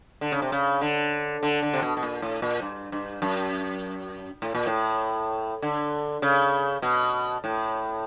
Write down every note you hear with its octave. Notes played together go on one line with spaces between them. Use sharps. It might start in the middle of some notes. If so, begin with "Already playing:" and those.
D3
C#3
C3
C#3
D3
D3
D3
C3
B2
B2
A#2
A2
A#2
G2
G2
F#2
A2
A#2
A2
D3
C#3
B2
A2